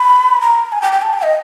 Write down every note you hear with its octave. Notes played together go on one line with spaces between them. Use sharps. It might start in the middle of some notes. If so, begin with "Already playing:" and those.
Already playing: B5
A#5
G#5
G5
G5
A5
G5
D#5